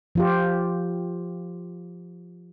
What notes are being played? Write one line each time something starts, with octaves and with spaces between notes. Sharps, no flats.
F3 F4 G4